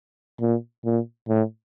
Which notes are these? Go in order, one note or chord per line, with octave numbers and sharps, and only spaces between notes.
A#2
A#2
A2